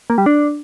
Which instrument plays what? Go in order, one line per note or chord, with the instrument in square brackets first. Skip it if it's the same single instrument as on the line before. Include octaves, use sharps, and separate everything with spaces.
[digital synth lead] A#3
G3
D4